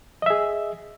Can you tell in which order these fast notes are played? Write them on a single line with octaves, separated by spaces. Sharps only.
D#5 E5 G#4